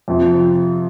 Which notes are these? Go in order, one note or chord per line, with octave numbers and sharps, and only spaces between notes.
F2 C3 F3